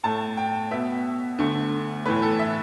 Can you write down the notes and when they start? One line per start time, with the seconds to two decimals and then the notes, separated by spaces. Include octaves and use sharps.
0.03 A2 A3 A5
0.37 G5
0.71 B2 B3 E5
1.38 D2 D3 A3
2.05 A2 E3 A3 B4
2.22 A4
2.39 E5